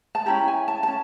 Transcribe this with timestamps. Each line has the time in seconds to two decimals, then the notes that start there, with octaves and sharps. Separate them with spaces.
0.15 A5
0.26 C#4 E4 G4 A#5
0.48 G#5
0.68 A5
0.83 A5
0.88 C#4